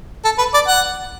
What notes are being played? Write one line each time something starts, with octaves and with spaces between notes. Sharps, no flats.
A4
B4
D5
F#5